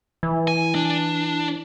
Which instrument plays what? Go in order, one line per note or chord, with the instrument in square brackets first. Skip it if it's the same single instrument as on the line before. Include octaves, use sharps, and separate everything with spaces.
[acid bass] E3
[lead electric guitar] G#5
D4